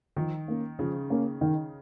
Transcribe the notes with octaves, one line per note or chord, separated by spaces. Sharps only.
D#3 F3
A#3 C#4
C#3 F3
A#3 C#4
D#3